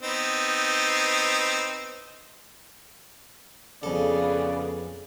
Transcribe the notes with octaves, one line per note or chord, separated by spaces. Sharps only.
B3 C4 D#4
F2 C#3 B3 G#4 A4 D5